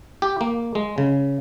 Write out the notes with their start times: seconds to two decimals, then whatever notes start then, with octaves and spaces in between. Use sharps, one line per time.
0.22 G4
0.41 A#3
0.75 G#3
0.98 C#3